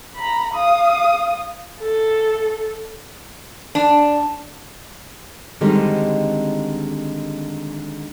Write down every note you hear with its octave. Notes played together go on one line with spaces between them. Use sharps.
A#5 B5
F5 D#6
A4
D4
D3 D#3 G3 G#3 C4 D#4